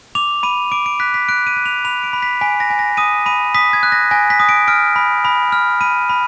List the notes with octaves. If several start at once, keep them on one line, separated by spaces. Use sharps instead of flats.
D6 F7
B5 D#7
D6 D7
D7
F#6 B6
B6
F#6 D7
D#7
F#6
F7
B5 F7
D7
B5
B6
G#5 B6
A#6
G#5
A#6
D#6 D#7
B5 D#7
D#6 B6
G#6
F#6
A#6
G#5 A#6
B6
D#6
D7
F6 D7
B5
B5
F6
B5 D#7
B5